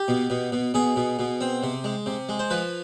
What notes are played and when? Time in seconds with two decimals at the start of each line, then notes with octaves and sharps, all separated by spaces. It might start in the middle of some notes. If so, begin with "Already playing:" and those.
Already playing: G4
0.08 B2
0.30 B2
0.52 B2
0.74 B2 G#4
0.96 B2
1.19 B2
1.41 C4
1.63 C3
1.84 G#3
2.06 C3
2.29 G#3
2.39 C5
2.50 F3 B4